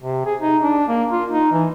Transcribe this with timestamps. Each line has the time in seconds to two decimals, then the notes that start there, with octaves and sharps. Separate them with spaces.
0.01 C3
0.25 G#4
0.42 D#4
0.63 D4
0.88 A#3
1.12 F4
1.30 D#4
1.52 E3